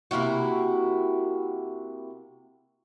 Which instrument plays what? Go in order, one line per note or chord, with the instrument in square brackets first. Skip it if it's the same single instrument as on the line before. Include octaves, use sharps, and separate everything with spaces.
[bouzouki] C3 A#3 E4 F#4